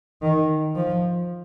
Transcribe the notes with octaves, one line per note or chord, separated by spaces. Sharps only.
D#3
F3